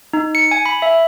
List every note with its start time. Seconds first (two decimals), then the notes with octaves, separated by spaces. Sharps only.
0.13 D#4
0.35 C#7
0.51 G#5
0.66 B5
0.82 E5